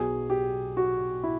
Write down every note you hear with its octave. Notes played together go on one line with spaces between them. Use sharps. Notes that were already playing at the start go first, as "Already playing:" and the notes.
Already playing: B1 B2 F#3 G#4
G4
F#4
E4